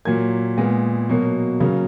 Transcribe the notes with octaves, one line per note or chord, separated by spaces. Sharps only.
A#2 F#3 A#3 G#6
A#2 G#3 B3
B2 F#3 A#3
C#3 F#3 A#3